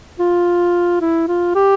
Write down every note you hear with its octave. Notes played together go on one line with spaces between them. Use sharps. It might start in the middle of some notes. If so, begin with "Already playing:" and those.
F4
E4
F4
G4